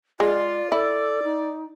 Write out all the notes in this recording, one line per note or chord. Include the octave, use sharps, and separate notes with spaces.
G#3 F4 D5
E4 A4 D5
D#4